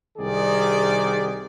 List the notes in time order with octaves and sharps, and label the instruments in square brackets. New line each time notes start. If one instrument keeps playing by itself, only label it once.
[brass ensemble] C2 D#3 G#4 D5